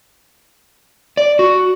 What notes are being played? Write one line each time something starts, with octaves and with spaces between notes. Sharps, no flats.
D5
F#4